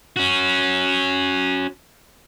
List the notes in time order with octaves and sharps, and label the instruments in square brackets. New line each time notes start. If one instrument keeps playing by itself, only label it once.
[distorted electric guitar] C#4 F#4